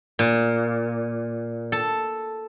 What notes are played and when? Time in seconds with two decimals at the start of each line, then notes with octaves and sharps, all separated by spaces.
0.19 A#2
1.72 A4